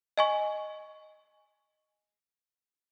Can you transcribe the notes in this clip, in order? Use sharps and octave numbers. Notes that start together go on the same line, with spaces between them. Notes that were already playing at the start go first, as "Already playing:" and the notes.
D#5 G#5 C#6